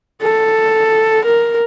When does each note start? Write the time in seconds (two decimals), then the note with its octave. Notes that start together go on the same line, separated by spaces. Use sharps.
0.23 A4
1.25 A#4